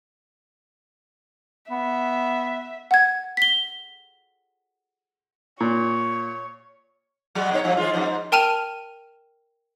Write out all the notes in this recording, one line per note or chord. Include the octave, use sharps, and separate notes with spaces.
B3 E5
F#5 G#6
B6 G7
A#2 C#5
F#3 G#3 F#4
B2 D#4 C#5
G2 F3 F#3
D#3 G#3 F4
F2 G#2
G#2
A#4 G5 A5 F6 D#7 F7